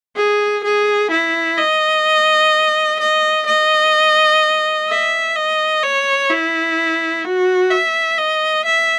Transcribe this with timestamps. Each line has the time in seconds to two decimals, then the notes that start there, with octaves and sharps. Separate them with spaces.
0.16 G#4
0.64 G#4
1.11 E4
1.58 D#5
3.00 D#5
3.47 D#5
4.88 E5
5.36 D#5
5.83 C#5
6.30 E4
7.24 F#4
7.71 E5
8.18 D#5
8.65 E5